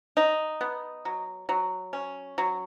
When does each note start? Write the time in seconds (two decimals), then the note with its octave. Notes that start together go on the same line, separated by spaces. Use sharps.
0.17 D#4
0.61 B3
1.05 F#3
1.49 F#3
1.93 C#4
2.38 F#3